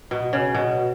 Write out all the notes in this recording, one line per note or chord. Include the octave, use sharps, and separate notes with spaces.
B2
C#3
B2